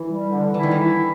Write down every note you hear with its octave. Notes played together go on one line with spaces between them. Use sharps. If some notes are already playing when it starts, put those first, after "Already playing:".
Already playing: E3
G3
D3
E3 E4
D#3
E3
E4